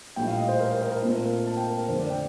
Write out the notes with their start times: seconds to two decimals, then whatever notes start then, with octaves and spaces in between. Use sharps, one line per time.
0.16 A#1 A2 G3 G5
0.27 F5
0.38 D#5
0.48 C5
0.59 A#4
0.70 C5
0.81 A#4
0.92 A#4
1.02 A#2 A3 C4 F4
1.12 A#4
1.46 A5
1.57 G5
1.67 A#4
1.78 A#4
1.89 F2 D3 A3 C5
1.99 D5
2.10 G5